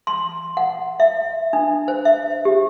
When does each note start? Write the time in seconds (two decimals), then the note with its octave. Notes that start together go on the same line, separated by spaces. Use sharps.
0.07 C6
0.57 F#5
1.00 E5
1.53 D4
1.88 C5
2.05 E5
2.45 G4